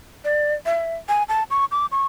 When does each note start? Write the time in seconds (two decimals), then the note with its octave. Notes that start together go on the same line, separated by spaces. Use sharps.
0.24 D5
0.66 E5
1.09 G#5
1.29 A5
1.50 C#6
1.71 D6
1.92 C#6